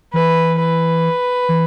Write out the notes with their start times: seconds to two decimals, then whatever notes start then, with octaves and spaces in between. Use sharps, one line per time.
0.13 E3 B4
0.59 B4
1.49 E3